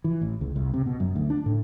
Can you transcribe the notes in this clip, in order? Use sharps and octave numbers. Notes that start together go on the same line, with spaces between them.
E3
A1
C#2
C2
C3
B2
F#2
D2
D4
A2